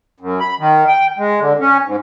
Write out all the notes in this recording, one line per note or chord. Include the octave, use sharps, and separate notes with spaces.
F#2
B5
D#3
G5
G#3
D3
C#4
G#2